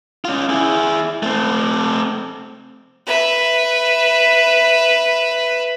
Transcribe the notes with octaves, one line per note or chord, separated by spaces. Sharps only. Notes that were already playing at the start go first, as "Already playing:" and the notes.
C#4 F4
E4 G#4
A3 C4
B4 E5